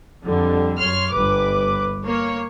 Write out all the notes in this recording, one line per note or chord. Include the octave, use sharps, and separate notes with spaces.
F2 D3 G3
F#2 C#5 C6 F6
G1 B4 D6
A#3 C#5